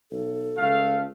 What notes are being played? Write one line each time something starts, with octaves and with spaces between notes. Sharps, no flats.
B1 A4
C#2 A3 F5